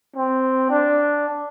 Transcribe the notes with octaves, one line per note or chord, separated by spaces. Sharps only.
C4
D4